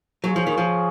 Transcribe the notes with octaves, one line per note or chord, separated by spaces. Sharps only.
F#3 F4 G#4 C#5
F3
D#3
F3